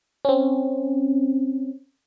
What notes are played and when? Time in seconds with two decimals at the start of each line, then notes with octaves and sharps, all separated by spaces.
0.25 C4 C#4